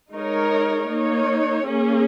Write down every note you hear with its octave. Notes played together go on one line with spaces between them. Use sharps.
G#3 D#4 A#4 C#5
A#3 D#4 C#5
A#3 C#4 G#4